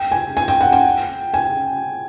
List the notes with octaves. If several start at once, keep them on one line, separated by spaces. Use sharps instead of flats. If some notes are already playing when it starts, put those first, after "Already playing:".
Already playing: G5
G#5
G#5
G5
F#5
G5
G#5